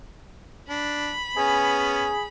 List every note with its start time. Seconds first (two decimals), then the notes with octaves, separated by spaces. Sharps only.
0.69 D4 B5
1.37 B3 C#4 G#4